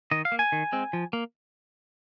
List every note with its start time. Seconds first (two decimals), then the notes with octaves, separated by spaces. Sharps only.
0.11 D#3 D#5
0.25 F5
0.32 A#3
0.39 G#5
0.52 D#3
0.72 G#3 C4
0.93 F3
1.13 A#3